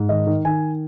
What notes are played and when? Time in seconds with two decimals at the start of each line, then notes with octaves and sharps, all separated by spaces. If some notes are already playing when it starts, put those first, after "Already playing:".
Already playing: G#2
0.09 D#3 D#5
0.27 D#3
0.45 D#3 G#5